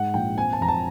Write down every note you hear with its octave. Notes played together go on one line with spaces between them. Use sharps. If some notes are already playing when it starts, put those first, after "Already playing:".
Already playing: G#2 G#3 F#5
A#1 G5
C4 G#5
A5
F2 A#5
A5